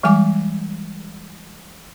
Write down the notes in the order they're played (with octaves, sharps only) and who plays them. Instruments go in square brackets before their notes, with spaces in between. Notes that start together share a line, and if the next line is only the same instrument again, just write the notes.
[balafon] E3 G3 G#3 G#5 D6